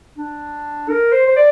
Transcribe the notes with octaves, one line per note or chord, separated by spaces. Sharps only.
D4
A#4
C5
C5
D5